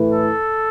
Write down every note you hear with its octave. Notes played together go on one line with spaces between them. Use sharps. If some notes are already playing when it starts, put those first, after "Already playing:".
Already playing: A2 E3
A4